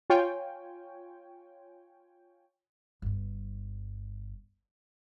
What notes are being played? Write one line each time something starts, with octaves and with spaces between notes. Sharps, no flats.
F4 C#5 G5 G#5
G1 G2